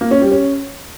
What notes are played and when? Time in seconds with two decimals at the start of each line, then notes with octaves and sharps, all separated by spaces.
0.01 A#3
0.11 C#4
0.21 G3
0.32 C#4